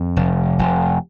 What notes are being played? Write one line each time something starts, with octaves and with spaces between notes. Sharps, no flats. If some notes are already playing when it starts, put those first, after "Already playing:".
Already playing: F2
F1
F1